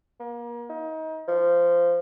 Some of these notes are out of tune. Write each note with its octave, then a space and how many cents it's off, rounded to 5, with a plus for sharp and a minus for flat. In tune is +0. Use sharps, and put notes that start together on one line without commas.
A#3 +35
D#4 +30
F3 -15